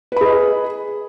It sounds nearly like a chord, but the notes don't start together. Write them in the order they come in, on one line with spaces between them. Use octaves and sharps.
B4 B5 G#4 D#5